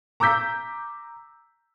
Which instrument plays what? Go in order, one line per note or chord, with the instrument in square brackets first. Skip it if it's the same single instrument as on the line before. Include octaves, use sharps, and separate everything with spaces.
[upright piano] A#5 D6 E6 G6 B6